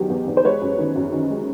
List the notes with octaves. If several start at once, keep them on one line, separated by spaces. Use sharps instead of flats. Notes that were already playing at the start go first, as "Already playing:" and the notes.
Already playing: E2 D#3 F#3 G4
E2
E2
C5
G#3 B4 C#5
F#2
D#3
F#2
D#3
G#3